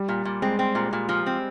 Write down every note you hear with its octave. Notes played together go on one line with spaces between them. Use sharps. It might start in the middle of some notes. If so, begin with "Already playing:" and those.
Already playing: G3
A#2
A#2
G#3 C4
C4
A#2
A#2
F3
C4